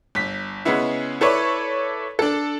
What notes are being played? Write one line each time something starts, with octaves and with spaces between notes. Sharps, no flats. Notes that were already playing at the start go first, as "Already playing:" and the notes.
G1 B6
C#3 G#3 B3 C#4 E4
E4 A4 B4 C#5 D5
D4 A4